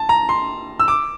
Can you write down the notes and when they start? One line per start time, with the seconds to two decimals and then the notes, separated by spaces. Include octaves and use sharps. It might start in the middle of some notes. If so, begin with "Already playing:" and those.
Already playing: A5
0.09 A#5
0.29 C6
0.80 E6
0.88 D6